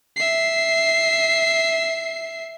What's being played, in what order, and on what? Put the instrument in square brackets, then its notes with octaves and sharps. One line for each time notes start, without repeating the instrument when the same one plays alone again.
[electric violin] E5 C7